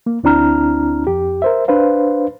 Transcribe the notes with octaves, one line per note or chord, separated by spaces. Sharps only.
A#3
D2 C4 D4 E4 A#5 F6
F2 G4
A#4 C5 E5
D4 B4 C5 F5